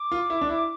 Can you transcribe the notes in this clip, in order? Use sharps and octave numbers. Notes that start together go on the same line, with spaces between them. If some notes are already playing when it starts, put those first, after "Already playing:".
Already playing: D6
F4
E4
D4
E4